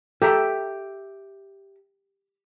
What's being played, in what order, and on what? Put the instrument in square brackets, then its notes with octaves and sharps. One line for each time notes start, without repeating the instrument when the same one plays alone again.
[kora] G4 [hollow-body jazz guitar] A4 E5 A#5